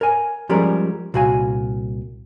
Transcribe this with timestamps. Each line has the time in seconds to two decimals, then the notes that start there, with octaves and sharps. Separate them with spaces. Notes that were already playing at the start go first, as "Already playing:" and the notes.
0.01 A#4 C#5 G#5
0.49 F3 G3 G#3 C#4 G#4 A#4
1.14 C2 A#2 F#4 F5 G#5